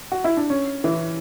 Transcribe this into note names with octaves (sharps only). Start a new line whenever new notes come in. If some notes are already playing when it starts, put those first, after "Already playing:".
F#4
E4
D4
C#4
E3